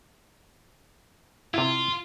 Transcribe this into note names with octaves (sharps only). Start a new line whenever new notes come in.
C3 E4 F4